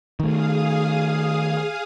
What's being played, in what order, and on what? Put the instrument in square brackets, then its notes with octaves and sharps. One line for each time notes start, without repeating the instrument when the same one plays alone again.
[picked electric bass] D#3 A3 [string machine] G#4 F5 D#6